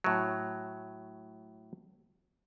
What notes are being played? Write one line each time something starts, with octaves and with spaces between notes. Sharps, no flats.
A2 F#3